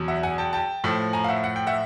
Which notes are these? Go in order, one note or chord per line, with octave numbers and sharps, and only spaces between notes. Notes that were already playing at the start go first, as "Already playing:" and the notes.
Already playing: E2 B2 F#3
E5 F#5
F#5 G#5
G5 A5
G5 A5
A2 F3
G#5 A#5
F5
E5 F#5
F#5
G5
E5 F#5